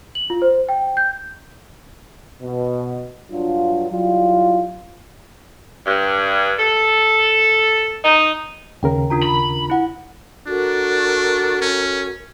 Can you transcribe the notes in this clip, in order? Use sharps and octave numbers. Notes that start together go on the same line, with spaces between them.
F#7
F4
C5
G5
G6
B2
G2 F#3 D4 F4
F#3 G3 E4 F4
G2
A4
D#4
D#2 C#3 A#4 G5
D4 F4 A#5
B5
E4 F#5
D4 F#4 A4 A#4
C#4